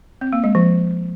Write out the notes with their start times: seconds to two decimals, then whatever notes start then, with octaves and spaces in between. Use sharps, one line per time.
0.21 C4
0.33 A#3
0.44 G#3
0.55 F3